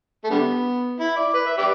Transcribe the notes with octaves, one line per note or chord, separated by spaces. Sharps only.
A3
D3 G3 B3
E4
D5
B4
E5
G4 B4 D5